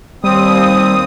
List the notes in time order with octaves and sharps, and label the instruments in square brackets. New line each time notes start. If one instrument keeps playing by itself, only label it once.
[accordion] D#2 C4 D#6 [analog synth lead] G3